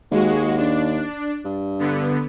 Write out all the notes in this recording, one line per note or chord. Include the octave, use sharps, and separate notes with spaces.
D#2 G#3 F#4
D4
G2
D3 B3